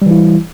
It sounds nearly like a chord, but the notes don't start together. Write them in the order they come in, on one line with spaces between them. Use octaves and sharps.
G3 E3 E4